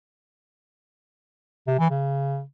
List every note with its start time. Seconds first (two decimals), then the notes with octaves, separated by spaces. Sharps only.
1.67 C3
1.79 E3
1.91 C#3